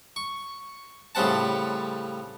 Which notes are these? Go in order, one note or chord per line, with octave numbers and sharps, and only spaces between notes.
C#6
A2 C#3 G3 C4 F#5 A5